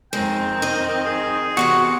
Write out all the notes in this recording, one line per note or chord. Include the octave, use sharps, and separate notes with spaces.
F2 D#3 G#3 C4 G5
D#4 D#5
G#4
E2 C3 F#4 F#5